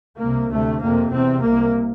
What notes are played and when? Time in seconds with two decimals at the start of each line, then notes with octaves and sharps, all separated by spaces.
0.19 C2 C3 A#3
0.50 D2 C3 A3
0.81 F2 C3 A#3
1.12 E2 C3 C4
1.43 C2 C3 A#3